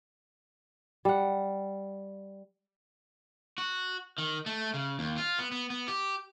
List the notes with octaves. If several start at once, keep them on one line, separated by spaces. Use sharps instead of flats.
G3 F#5
F#4
D#3
A3
C#3
D#2
F4
B3
B3
B3
G4